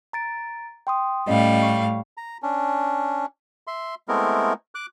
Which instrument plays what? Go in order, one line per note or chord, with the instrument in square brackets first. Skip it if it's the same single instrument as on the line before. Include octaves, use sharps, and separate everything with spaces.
[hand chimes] A#5 A6 D7
G5 C6 D#6
[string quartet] A2 G3 F5 [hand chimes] C#4 D#5
[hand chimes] C#6
[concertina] A#5
C#4 D4
E5 C6
G#3 A3 B3 C4 E4 A#4
D6 F#6